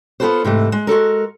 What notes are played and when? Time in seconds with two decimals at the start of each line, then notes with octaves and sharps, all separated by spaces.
0.20 B3 F4 F#4 A4 B4 C5
0.44 G#2 C3 E3 A3
0.72 G#3
0.87 G#3 F#4 A4 A#4